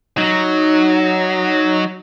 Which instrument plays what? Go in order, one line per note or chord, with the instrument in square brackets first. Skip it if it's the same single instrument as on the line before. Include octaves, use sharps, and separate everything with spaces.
[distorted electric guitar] F#3 [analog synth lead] D#4